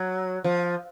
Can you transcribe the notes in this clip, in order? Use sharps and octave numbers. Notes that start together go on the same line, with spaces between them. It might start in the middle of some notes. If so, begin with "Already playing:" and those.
Already playing: F#3
F3